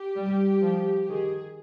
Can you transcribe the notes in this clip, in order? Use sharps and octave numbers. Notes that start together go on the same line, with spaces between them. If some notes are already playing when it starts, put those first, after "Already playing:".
Already playing: G4
G3
F3
D#3 G#4